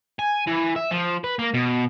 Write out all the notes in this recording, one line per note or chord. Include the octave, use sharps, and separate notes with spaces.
G#5
E3
E5
F3
B4
A#3
B2